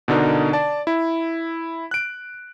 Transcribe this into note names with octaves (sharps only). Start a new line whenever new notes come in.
B2 D3 D4 D#4 A#4
D5 A5
E4
F#6 D7